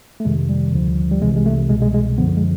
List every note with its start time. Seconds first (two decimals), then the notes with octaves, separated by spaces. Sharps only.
0.20 A3
0.25 F2 C3 D#3 G#3
0.49 G3
0.73 D2 D3 F3
1.11 G3
1.21 C2 C3 E3 G#3
1.36 G#3
1.46 A3
1.69 C2 B2 G#3
1.82 G#3
1.94 G#3
2.18 F#2 D3 F3 B3
2.37 G#3